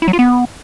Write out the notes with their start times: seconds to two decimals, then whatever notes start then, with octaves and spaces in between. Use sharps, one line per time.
0.02 E4
0.08 F#3
0.13 F4
0.19 B3